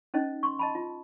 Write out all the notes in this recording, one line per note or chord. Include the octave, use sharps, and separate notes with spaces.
C#4 D#4 C5 D#5
C6 C#6
D#5 A5 B5
F4